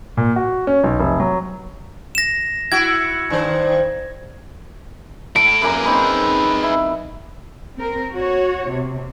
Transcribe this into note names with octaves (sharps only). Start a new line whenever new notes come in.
A#2
F#4
C#4
B1
F1
F#3
A#6 E7
E4 F#4 G#6
G2 D#3 C5
E4 A4 D7
F#2 A#3 G#4 B4 A#5
C4 D#4 B5
E4
C4 A#4
F#4 C#5
C3